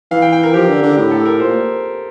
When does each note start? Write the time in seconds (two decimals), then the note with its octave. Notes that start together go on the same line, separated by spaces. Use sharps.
0.11 E3 F5
0.22 G5
0.32 G5
0.43 A#4
0.54 F3 G4
0.68 D3
0.82 D3
0.97 A2 G4
1.11 A4
1.26 A#4
1.39 A#2 C5